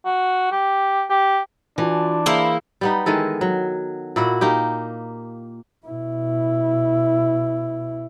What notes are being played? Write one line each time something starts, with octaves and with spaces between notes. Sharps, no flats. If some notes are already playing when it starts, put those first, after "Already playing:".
F#4
G4
G4
E3 D4 F4 F#4 A5
A#3 E4 G#4 C5 F5 B5
G3 B3 D#4
D#3 E3 G#3 A4
F#3
A#2 E4 F#4
A#3 D#4 G4
B2 E4